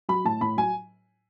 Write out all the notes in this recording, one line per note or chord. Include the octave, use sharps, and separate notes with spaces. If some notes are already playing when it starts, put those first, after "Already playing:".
F#3 B5
A2 A5
A2 B5
F#3 G#5